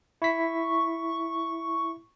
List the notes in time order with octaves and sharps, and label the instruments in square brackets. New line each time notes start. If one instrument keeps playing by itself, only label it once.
[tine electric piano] E4 B6 [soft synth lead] C#6